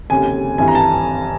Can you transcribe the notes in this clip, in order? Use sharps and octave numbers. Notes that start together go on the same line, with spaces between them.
F1 D#2 C#3 G#5
G#1 G2 E3 G#5
A#5
A5